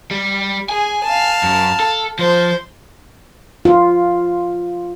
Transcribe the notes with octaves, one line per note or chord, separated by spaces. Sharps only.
G3
G#4 G#5
F5 A5
F#2
A4
F3 C5
F4